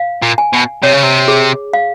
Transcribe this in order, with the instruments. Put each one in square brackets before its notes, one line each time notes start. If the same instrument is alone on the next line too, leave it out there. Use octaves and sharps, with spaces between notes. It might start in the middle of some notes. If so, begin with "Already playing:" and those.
Already playing: [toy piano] F5
[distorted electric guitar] A#2
[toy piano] G#5
[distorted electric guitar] B2
[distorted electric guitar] C3 [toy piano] C#5
[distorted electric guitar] C#3
C3
[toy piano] G#4
F5